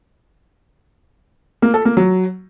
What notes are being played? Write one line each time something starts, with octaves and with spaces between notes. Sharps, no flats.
A#3
A4
A#3
F#3